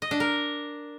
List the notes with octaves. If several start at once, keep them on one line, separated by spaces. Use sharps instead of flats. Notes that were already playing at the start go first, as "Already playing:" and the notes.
D#5
D4
A#4